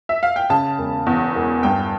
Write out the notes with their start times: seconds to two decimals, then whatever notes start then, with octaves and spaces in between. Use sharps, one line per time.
0.09 E5
0.23 F5
0.36 G5
0.50 C#3 A5
0.78 E1
1.06 E2
1.35 E1
1.63 G2 G5